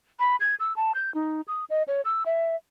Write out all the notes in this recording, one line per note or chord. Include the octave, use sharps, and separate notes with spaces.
B5
G#6
E6
A5
G6
D#4
D#6
D#5
C#5
E6
E5